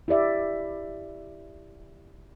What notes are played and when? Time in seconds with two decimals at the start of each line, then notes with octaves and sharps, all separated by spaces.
0.08 E4 G4 D5 E5